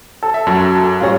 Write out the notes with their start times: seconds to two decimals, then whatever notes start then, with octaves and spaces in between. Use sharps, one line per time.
0.23 A4
0.34 E5
0.47 F#2 F#4
1.00 G#2 G3 F4 G#4 C#5